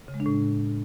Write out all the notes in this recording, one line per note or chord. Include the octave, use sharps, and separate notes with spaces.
C#3
G#3
D4
A2